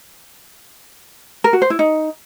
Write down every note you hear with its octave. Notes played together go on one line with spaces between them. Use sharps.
A#4
F#4
C5
E4
D#4